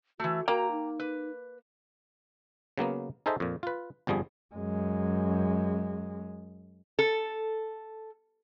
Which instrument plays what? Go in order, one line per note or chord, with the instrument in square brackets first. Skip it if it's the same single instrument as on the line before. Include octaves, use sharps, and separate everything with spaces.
[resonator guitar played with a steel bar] E3 A3 [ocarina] F#4
[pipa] A#3 [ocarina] F#4 [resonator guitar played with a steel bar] G5 A#5
[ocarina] D#4
[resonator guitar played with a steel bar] B4
[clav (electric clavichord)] C#3 F#3 A#3 B3
D#4 G#4 A4 C5 D#5 E5
F2 A#2
F4 B4
G1 F2 F3 G3 G#4
[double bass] F#2 G#3
[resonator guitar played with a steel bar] A4